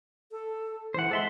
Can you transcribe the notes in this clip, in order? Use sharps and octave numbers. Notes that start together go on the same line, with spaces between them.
A4
E3 C5 F#5
G#3 A4 E5 C6